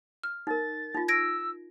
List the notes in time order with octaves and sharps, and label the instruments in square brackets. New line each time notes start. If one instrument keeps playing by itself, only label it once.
[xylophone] F6
[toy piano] D#4 A#4 [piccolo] A6
[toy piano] D#4 F4
[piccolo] E6 [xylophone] G#6 A#6 D7